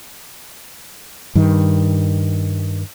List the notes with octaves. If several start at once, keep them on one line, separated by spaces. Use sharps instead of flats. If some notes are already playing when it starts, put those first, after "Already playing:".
G2 D#3